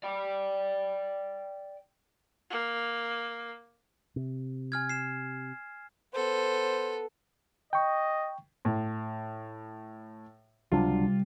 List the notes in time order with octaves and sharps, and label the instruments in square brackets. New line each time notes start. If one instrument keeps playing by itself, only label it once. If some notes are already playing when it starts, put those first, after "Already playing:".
[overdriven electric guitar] D5 G5
[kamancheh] A#3
[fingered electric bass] C3
[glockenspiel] G#5 F6 G#6
C7 E7
[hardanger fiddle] B3 A4 [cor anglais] C5
[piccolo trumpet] D#5 [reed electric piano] G5 C#6
[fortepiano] A2
[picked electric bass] C#2 F#3 D4 [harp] C3 G3 [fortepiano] F4